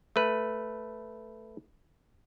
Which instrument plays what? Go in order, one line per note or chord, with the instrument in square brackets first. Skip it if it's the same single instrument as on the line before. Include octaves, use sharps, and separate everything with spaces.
[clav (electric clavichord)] A3 B4